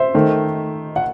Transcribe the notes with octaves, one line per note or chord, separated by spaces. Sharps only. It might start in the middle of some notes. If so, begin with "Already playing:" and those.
Already playing: C5 E5
D#3 A3
F#5